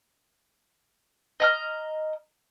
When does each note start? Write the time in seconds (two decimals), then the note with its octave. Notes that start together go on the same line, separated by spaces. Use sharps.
1.40 D#5 A#5 F6